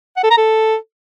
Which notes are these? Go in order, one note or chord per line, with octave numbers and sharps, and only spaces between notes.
F#5
A4
A#5
A4